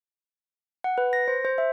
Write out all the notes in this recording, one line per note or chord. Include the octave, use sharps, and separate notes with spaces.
F#5
B4
A#6
C5
C5
E5